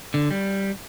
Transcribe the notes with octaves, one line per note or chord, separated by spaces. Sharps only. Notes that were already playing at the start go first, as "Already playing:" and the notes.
D3
G3